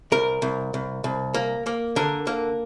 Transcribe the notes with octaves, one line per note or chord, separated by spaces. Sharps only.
C2 A#4
C2
C2
C2
A#3
A#3
D3 A#4
A#3